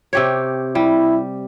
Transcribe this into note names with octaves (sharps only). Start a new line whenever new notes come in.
C3 G4 C#5
G3 E4